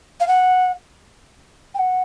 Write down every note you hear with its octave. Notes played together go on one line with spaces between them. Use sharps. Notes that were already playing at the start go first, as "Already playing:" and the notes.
F5
F#5
G5
F#5